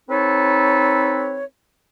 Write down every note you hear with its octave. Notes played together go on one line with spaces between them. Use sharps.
C4 D#4 A4 B4 C#5